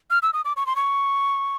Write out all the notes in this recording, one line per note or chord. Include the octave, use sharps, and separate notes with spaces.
F6
E6
D#6
D6
C#6
C6
C#6